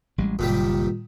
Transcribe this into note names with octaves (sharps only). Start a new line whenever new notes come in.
A1 G3 G#3
F#1 A#2 D#3 G3